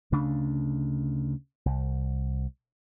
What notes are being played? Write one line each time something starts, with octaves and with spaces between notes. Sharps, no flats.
D2 C#3 A3 D4
C2